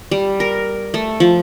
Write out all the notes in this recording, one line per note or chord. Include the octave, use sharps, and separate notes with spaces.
G3
A#4
A3
F3